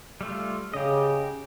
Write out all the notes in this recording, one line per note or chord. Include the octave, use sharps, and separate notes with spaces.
G3 A3 F4
C#3 G4 D#5